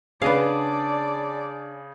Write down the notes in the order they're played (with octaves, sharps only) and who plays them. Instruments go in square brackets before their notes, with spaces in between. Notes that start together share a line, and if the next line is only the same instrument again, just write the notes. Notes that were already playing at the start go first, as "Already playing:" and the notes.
[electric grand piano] C#3 G#4 [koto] B3 D#5 F5 [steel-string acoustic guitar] C#4 D4 [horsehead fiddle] D5